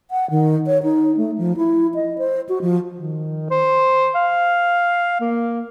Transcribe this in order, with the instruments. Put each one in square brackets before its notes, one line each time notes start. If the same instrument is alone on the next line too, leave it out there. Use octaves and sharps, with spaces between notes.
[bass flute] F#5
D#3
C#5
D#4
A3
F3
E4
D#5
C5
F#4
F3
[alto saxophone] D#3
C5
F5
A#3